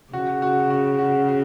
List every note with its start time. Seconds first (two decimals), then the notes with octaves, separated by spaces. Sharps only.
0.13 C#3 F#4
0.42 F#4
0.70 F#4
0.99 F#4
1.29 F#4